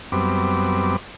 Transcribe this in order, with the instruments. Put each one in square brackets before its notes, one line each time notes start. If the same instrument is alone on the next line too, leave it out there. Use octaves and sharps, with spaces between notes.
[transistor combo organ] F#2 G3 B3 C4 D6